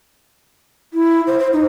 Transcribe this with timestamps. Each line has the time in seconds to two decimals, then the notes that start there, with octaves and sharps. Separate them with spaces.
0.93 E4
1.27 C5
1.39 C5
1.53 D#4